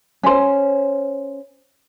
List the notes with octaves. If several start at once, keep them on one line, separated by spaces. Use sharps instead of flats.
C#4 C5